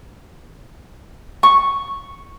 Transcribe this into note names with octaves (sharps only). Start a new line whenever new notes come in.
C#6